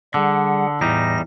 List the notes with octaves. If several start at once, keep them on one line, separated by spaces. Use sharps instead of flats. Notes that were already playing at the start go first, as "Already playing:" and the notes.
D3 G3 G#4 F#5
E2 A2 G3 D#4 A#6